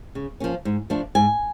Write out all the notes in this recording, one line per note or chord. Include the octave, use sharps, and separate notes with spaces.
C#3
F3 A#3 C#4
G#2
F3 A3 D4
G#2 G#5